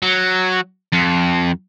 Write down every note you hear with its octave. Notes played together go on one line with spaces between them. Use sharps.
F#3
F2